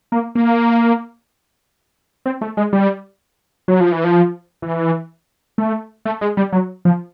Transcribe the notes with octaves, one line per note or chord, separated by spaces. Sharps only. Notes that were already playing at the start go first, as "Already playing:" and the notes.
A#3
A#3
C4
A3
G#3
G3
F#3
F3
E3
F3
E3
A3
A3
G#3
G3
F#3
F3